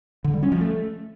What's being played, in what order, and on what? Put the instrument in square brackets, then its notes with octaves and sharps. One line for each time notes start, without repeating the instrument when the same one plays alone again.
[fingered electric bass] D3
G3
C#4
F3
A3